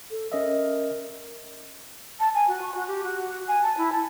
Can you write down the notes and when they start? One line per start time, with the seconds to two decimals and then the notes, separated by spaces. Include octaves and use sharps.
0.11 A4
0.32 C#4 A#4 D#5 E5
2.20 A5
2.34 G#5
2.47 F#4
2.62 C#6
2.74 F#4
2.87 G4
3.03 F#4
3.47 G#5
3.62 A5
3.77 E4
3.92 A5